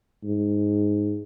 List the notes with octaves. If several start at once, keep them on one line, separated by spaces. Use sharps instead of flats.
G#2